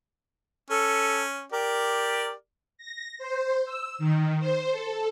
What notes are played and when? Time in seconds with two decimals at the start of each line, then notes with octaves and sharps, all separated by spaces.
0.71 C#4 A4
1.52 G4 A#4 D5
2.78 A#6
3.18 C5
3.65 E6
3.98 D#3
4.39 C5
4.71 A4